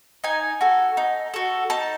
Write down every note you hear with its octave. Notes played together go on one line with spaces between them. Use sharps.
D#4 G#5
F#4 A4
D#4
F#4 A4
D#4 A5